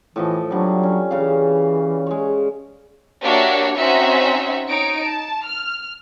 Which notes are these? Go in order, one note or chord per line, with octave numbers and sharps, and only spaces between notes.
A2 E3 F3 D#5
D3 F#3 G3
C#4
C#3 E3 F5
G#3 C#5
A#3 D4 F#4 G4 C#5 E5
C4 C#4 D#4 F#4 E5
D#4 C#5 D7
A5
F6